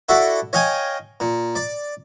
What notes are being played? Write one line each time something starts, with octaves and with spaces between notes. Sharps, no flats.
E4 F#4 A4 D5
C#5 D#5 F5 G5 G#5
A#2
D5